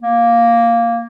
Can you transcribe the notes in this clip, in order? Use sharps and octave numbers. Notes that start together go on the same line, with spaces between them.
A#3